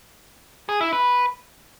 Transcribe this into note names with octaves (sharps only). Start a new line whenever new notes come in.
G#4
E4
B4